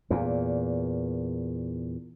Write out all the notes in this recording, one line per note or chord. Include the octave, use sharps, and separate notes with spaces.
E2 A#2